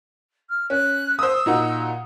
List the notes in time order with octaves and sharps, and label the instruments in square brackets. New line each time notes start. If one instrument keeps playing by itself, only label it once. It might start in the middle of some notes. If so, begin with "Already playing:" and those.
[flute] F6
[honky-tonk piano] C#4 [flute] F#6
[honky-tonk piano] C5 D#6 [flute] E6
[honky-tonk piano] A#2 D#4 F#4